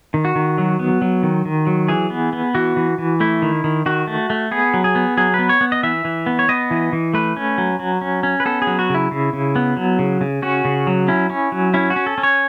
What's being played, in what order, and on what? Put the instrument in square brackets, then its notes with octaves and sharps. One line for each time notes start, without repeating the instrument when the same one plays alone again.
[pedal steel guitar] D#3
F#4
D#3
F#3
B3
F#3
D#3
D#3
F#3
E3 G#4
B3
B3
E3 F#4
E3
E3
A3 E4
D#3
D#3
D#3 F#4
A3
A3
B3 G#4
F#3
G#4
B3
F#3 G#4
B3 B4
C#5
B3
D#5
E3 E5
E3
B3
C#5
B3 D#5
E3
E3
A3 B4
C#4
F#3
F#3
C#4
C#4
B4
B3 A4
G#4
F#3
F#4
C#3
E4
C#3
C#3
B3
F#3
C#3
C#3
C#4 F#4
C#3
F#3
C#4 E4
C#4
F#3
C#4 E4
F#4
C#4
A4
C#4
C#5